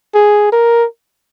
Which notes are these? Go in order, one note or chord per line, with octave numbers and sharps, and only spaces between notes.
G#4
A#4